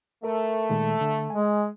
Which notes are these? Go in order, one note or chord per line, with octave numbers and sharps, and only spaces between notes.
A3 A#4 E5
A#2 D#3 G#3
D3
G#3 G#5